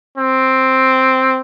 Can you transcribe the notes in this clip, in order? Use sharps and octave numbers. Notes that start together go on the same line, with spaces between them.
C4